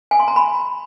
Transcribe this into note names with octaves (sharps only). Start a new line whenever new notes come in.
G#5
C6
A#5
B5